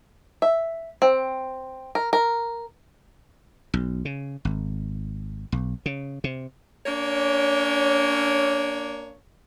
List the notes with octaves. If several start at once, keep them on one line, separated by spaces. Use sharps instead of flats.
E5
C4
A#4
A#4
B1
C#3
G#1
B1
C#3
C3
A#3 C#4 D4 C#5